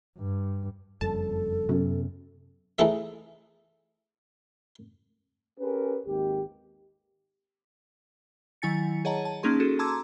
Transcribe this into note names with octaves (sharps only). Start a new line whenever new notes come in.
G2
F#1 F2 G3 A4 A5
F#2 C3 B3 C#4
E3 A3 D#4 G#4 E5
C#4 G4 G#4 A#4 B4
G#1 D#2 G4
D#3 F#3 E4 G#5 A6 C#7
G#4 C#5 D#5 F#5 A5 A#5
A5
A#3 C#4 D#4 G#4 C6
F#4 G#4 A4
A5 A#5 C6 D6 E6 G#6